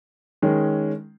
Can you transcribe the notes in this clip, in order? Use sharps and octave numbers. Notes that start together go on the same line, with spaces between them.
D#3 G#3 C#4